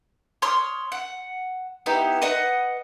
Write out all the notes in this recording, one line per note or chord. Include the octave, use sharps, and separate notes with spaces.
C#5 C6 D#6 F6
F#5
B3 D#4 E4 G4
B4 D#5 F#5